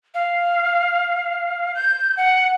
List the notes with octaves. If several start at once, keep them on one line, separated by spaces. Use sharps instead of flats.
F5
G6
F#5